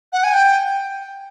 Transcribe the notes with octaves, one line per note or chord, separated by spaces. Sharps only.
F#5
G#5
G5